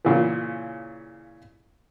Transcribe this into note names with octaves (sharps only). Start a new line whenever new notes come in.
A#2 C#3 E3